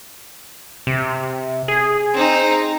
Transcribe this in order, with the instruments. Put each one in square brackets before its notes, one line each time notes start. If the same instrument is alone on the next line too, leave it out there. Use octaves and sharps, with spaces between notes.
[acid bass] C3
G#4
[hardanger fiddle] C4 D#4